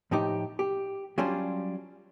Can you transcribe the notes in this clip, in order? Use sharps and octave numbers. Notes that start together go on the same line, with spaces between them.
A2 F3 D#4 G4
G4
F#3 G3 C#4 D4 F4 C5